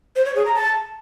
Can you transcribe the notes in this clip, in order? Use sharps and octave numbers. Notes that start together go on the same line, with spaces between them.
C5
C#5
G#4
A#5
A5